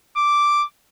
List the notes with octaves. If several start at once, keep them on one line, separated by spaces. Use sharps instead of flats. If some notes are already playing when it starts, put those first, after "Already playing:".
D6